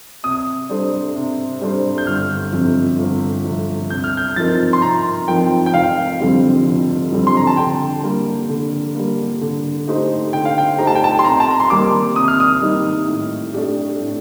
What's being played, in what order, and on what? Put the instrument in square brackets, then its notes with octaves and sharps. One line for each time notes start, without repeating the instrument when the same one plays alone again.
[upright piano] C3 [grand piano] D#6
[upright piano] G3 D4 A4 C5
C3
G3 D4 A4 C5
[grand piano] G6
[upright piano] G1 [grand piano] F6
[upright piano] F2 C3
G1
F2 C3
[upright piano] C3 [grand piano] G6
[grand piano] F6
G6
[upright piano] F3 C4 D#4 A#4 [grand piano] A6
[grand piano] C6
[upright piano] C3 [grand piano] A#5
[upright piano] F3 C4 D#4 A#4 [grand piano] G5
[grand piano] G5
[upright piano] F1 [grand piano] F5
[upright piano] F2 D3 G3 C4
F1
F2 D3 G3 C4
[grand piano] C6
A#5
A5
[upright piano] D3 [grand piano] G5
[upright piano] G3 A#3
D3
G3 A#3
D3
A3 D#4 G4 C5
[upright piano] D3 [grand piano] G5
[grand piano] F5
G5
[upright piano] A3 D#4 G4 C5 [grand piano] A#5
[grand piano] A5
G5
A5
C6
[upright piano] C3 [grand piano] A#5
[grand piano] A5
A#5
C6
[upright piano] D#3 G3 A#3 D#4 [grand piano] D6
[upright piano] C3 [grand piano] D#6
[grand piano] F6
D#6
[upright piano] D#3 G3 A#3 D#4
A2
A3 D4 G4
A2